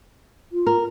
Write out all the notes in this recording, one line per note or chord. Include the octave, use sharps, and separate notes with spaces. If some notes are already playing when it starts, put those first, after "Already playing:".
F4
A#4